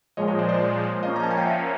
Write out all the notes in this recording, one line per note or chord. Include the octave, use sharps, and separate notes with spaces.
A#2 F3 G#3 C#5 D#5
C#5 D#5
C5 D5
C5 D5
F3 A#3 C#4 D#5 F5
A#5
A5
G#5
G5
E5 F#5